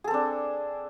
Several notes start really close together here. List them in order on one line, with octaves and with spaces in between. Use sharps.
G#4 A4 C4 D4